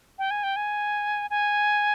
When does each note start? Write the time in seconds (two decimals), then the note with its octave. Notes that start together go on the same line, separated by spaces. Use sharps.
0.19 G5
0.31 G#5
0.43 G5
0.56 G#5
1.30 G#5